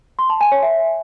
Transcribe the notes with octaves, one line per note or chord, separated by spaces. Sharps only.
C6
A5
G#5
C#5
E5